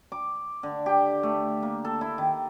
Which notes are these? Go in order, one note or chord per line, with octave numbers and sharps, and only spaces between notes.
D6
D3
G4
A3
A#3
A4
E4
D#3